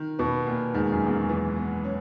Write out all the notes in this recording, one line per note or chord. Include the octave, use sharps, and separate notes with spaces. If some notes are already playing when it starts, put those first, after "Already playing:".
Already playing: D#3
B2 B4
A#2 B3
G#2 D#3
F#2
E2 D#3
F#2
E3
B3
C#4